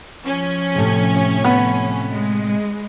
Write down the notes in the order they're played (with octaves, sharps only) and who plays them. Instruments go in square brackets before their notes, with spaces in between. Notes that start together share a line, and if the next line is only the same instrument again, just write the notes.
[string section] F3 C#4
[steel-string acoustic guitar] A2 C3
[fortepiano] B3
[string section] G#3